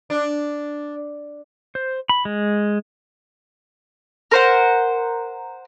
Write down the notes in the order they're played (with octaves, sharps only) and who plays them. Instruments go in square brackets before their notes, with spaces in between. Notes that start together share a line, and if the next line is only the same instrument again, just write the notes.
[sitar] D4
[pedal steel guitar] C5
B5
G#3
[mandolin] A#4 C5 F#5